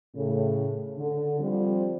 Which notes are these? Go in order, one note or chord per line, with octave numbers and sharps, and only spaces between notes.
A2 C#3
D3
F3 G3 C4